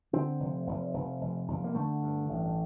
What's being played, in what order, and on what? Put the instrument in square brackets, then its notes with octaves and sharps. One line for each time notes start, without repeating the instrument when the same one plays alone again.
[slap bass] D3 C4
F1
F1
F1
F1
F1
A#3
D3 A3
G2
A1